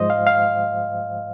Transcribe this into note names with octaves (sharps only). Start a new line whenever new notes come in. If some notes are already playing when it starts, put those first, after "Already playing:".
Already playing: G#2 F3 G#3 C5 D#5
F5
F5